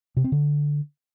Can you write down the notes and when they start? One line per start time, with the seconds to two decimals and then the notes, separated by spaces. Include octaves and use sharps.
0.17 C3
0.24 C4
0.32 D3